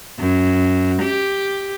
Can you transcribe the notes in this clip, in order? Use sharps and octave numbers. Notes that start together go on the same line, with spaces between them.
F#2
G4